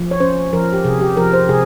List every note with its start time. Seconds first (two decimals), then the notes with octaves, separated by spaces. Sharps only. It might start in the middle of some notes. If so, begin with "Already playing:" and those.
Already playing: F3
0.11 C#5
0.20 C#4 C5
0.53 F3 A#4
0.73 G4
0.85 C3 G#4
1.01 G4
1.17 F3 A#4
1.33 C5
1.49 C3 G#4